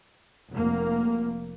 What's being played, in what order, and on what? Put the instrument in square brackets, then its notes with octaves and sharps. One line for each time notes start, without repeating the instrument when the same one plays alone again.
[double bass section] F1 A#3